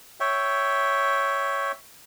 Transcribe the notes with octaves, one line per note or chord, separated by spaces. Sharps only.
C#5 E5 G5